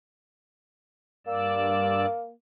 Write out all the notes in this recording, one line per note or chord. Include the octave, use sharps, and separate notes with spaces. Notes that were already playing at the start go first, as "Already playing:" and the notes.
G2 A#3 D5 E6